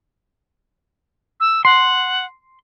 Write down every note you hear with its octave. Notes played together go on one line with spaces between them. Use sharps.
E6
F#5 C6